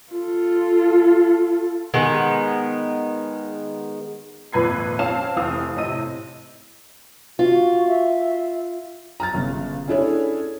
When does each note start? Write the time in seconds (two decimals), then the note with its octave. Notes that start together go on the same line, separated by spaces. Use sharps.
0.13 F4 A4
1.94 D#3 G#3 B3
4.53 G#1 F2 A#2 B4 G#6 C7
4.99 C4 C#4 F5 A5 E7
5.36 F1 E3 C4 F5 D#6
5.77 A2 C3 D#5 D#7
7.39 F4 F#4
7.87 E5
9.20 A#5 F6 A6
9.34 G1 C#3
9.88 C#4 D4 E4 G#4 A4 C#5